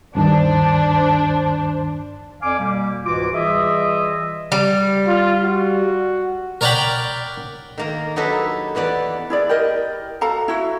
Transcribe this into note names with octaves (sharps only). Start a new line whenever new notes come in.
D2 G2 D#3 D4 C5
F2 D5 F5 G#5 D6
B2 G3 A#3
C#2 G#2 E3 F4 F#4 D6
E3 G3 F4 G#4 D#5 E5
G3
F4
F#4
A#4 C#5 D5 F#5 G5 B5
D#3 A#3 A#4
F#3 D#4 E4 G4 A4 B4
E2 E3 B3 D5
E4 G#4 D5
G4 A#4 D#5
F#4 A4 F5 A#5
E4 F#4